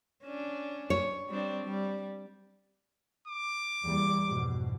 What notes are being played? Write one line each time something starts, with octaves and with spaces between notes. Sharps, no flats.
C#4 D4
C#5
G3 C4 D4
G3
D6
E2 G3 A#3
F2 G#2 B2